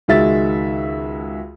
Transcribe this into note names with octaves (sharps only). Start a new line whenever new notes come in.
C#2 D#3 G#3 F#4 E5 A6